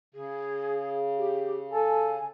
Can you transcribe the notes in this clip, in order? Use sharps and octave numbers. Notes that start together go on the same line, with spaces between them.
C#3 G#4
G4
A4 G#5